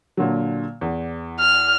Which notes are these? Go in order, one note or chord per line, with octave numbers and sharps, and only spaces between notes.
A#2 D3 F#3
E2
F6